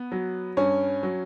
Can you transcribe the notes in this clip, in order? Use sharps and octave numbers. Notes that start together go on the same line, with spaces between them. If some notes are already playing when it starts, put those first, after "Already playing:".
Already playing: B3
F#3
G2 C#4 C#5
F#3